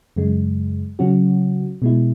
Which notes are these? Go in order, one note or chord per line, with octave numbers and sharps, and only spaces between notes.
F#2 C#3 G#3
C#3 F#3 C#4 F#4
B2 G#3 E4